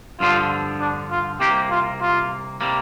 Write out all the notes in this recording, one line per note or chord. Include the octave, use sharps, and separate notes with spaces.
G2 D3 F3 F4
D4
F4
C2 C3 A#3 G4
F4
F4
C3 G3 A#3